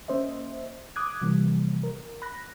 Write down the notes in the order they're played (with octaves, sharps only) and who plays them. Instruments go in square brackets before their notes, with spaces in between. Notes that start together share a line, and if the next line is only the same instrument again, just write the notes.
[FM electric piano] A#3 C#4 C5 D#5 E5
D6 D#6 F#6 G#6
C3 E3 F3 G3 A#3
A#4
B5 F#6 A#6